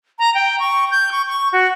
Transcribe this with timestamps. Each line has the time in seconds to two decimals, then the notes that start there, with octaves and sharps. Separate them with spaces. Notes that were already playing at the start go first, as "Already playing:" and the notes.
0.19 A#5
0.34 G5
0.60 C#6
0.91 G6
1.12 C#6
1.28 C#6
1.53 F#4